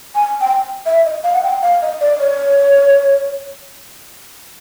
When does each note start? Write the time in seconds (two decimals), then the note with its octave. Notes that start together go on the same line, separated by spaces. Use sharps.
0.15 G#5
0.41 G5
0.86 E5
1.05 D#5
1.24 F5
1.33 F#5
1.43 G5
1.62 F5
1.82 D#5
2.01 D5
2.20 C#5